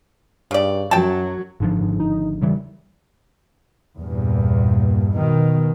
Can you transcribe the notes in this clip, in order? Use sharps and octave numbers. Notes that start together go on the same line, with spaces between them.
G2 C#3 D5
F#2 F#3 G5 A5
G#1 G#2 D3 F3
G#2
D#4
E1 C#3 E3 G3
E2 G2 A#2
B2 D#3